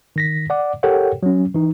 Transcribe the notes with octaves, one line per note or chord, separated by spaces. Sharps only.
D#3 A#6 B6
D5 F#5 D6
G4 A4 A#4 C#5 F#5 G5
F#3 C#4
E3 D#4